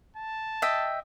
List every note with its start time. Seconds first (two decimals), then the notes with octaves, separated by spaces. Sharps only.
0.17 A5
0.62 D#5 E5 G5